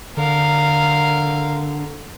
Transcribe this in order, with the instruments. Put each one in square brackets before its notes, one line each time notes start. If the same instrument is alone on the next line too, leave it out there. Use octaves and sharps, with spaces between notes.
[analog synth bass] D3 [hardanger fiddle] A#4 F5